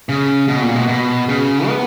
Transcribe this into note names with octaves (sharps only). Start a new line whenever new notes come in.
C#3
B2
A#2
B2
B2
C#3
B3